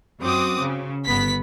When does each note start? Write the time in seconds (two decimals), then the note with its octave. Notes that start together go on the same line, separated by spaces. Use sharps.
0.21 F#2 C4 F#4 D6 D#6
0.62 C#3
1.06 G1 B3 B6